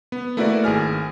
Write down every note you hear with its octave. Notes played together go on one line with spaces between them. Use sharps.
B3
A3 A#3 E4 F#4 B4 D5
G#1 G#4 G#5 F6